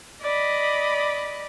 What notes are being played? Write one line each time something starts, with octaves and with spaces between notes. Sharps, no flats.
D5 D#5 B5